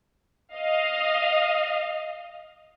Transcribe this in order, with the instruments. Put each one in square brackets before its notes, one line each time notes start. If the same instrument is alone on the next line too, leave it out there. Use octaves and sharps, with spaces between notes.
[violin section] D#5 F5